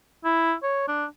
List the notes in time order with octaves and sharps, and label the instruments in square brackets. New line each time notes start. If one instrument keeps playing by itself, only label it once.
[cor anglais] E4
C#5
D4